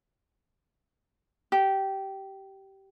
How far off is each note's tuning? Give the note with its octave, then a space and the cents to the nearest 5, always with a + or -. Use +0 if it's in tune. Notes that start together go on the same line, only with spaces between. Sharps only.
G4 -15